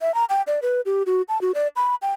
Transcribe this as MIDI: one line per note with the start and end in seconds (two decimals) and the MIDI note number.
0.01 0.14 76
0.14 0.25 82
0.29 0.42 79
0.47 0.59 74
0.62 0.81 71
0.86 1.03 67
1.06 1.22 66
1.29 1.40 81
1.41 1.52 66
1.55 1.68 74
1.76 1.95 83
2.02 2.13 79